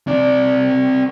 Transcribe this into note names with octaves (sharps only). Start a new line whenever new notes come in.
C4 D5